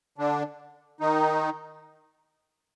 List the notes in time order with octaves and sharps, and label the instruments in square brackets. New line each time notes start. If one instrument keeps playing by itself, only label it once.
[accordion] D3 D4
D#3 D#4